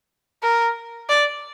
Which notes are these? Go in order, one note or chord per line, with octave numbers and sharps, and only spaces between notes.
A#4
D5